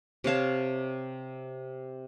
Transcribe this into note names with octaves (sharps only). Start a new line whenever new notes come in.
C3 C#5 F5 A5